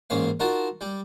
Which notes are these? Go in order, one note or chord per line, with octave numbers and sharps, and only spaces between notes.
A1 G#2 A#3 C#4 F5
D#4 F4 F#4 A#4 A5
G3 G4